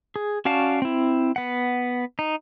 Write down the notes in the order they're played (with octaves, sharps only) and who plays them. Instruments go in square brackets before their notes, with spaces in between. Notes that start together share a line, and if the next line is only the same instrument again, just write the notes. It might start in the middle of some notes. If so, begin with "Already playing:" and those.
[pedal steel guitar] G#4
C#4 F#4 D5 F5 A5
C4 E4
B3 F#5
D#4